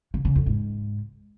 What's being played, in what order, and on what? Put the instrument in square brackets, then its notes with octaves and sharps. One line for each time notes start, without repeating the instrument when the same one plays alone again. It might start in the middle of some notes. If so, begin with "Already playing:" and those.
[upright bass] C#3
C#3
F2
G#2